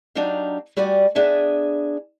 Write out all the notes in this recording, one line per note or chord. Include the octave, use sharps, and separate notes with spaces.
F#3 D4 D#4 G4 F5
G3 F#4 G4 D5 G#5
B3 D4 G#4 E5 G#5